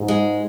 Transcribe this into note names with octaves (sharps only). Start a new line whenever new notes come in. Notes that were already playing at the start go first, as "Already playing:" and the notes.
Already playing: G#2
G#3